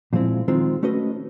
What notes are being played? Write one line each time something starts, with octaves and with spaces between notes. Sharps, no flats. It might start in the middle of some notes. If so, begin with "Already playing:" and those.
A#2 F3 G#3 C4 E4
D#3 G#3 C4 F4
A3 C#4 F#4 B4 D#5